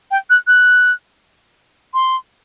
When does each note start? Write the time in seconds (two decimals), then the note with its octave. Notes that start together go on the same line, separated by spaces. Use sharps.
0.11 G5
0.30 F#6
0.47 F#6
1.94 C6